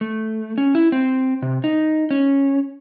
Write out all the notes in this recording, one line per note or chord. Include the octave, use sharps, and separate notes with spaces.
A3
C#4
E4
C4
C3
D#4
C#4